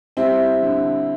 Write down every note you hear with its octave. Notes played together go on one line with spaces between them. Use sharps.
G3 C4 E4
D3